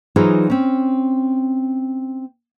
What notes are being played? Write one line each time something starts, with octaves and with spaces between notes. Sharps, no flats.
E3 F#3 D#4 F4 G#4 C5
C4 C#4